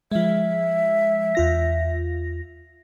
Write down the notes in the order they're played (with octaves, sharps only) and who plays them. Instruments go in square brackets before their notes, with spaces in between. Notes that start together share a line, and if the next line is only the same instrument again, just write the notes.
[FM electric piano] F3 G#3 [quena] E5
[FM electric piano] E2 F4 A#6